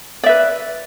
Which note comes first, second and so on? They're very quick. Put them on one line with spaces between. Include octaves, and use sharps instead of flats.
D5 E5 B4